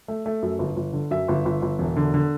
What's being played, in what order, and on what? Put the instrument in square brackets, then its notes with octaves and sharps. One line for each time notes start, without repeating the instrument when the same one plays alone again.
[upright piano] A3
A3
F#2
G1
G1
D3
F#2 E5
G1
G1
G1
E1
D3
D3